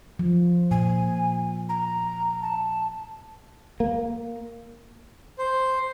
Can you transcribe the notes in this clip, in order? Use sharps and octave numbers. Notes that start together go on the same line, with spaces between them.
F3
A#2 G#5
A#5
A5
A#3
C5